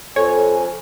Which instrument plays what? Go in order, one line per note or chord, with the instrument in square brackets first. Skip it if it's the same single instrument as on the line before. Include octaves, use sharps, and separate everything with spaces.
[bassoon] F2 [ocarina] A4 [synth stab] C#5 [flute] G#5